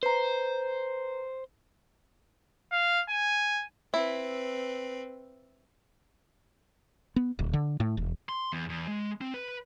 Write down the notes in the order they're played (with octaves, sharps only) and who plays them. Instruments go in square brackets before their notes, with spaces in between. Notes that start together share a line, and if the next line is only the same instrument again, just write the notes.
[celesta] B4 A#5 [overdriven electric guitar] C5
[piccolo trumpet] F5
G#5
[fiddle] C4 B4 [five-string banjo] E4
[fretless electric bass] B3
D1
D3
A2
E1
[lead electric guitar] C6
E2
E2
G#3
C4
B4